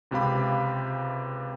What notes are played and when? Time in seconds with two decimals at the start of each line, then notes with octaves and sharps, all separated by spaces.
0.11 C#2 C3 G4 F5 B5